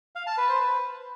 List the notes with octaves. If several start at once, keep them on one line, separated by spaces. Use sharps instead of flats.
F5
A5
B4
C5
B4